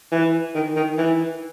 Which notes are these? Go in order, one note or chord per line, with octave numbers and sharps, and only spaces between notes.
E3
D#3
D#3
E3